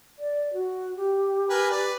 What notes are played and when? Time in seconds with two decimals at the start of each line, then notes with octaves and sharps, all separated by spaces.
0.19 D5
0.53 F#4
0.97 G4
1.49 A#4 B4 G#5
1.70 B4 D5